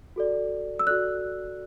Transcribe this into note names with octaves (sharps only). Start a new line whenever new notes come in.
F#4 A4 D5
E6
F#4 A4 D5 F#6